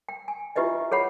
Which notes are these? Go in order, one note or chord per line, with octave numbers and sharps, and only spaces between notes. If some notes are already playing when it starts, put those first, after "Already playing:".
G5
G#5
E4 F4 G4 B4 D#5 E5
G#4 C#5 F#5 B5